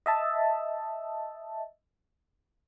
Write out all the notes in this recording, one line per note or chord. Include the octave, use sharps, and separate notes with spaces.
D#5 E5 A5